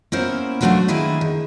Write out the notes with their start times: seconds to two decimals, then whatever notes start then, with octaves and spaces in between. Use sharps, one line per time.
0.12 A#3 B3 C#4 E4 A#4 C5
0.61 F#3 A3 A#3 D4 F4 F#4
0.88 D#3 A#3 D4 E4 G#4 B4
1.21 D#3